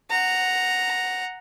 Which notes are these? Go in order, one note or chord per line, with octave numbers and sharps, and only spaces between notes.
F#5 A#5